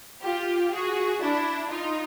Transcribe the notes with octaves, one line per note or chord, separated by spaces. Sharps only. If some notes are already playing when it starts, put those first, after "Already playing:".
F4 G4
F#4 G#4
D4 E4
D#4 F4